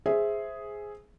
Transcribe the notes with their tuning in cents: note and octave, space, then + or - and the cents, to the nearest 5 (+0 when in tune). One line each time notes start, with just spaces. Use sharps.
G#4 +0 C5 +0 E5 +0